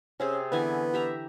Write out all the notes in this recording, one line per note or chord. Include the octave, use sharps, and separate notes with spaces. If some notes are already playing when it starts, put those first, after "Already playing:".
C3 C4 C#4 G#4
D3 E3 B3 G#5
G4 E5 A#5